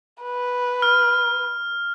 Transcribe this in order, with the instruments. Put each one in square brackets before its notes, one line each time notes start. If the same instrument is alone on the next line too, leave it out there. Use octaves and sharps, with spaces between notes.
[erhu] B4
[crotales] F6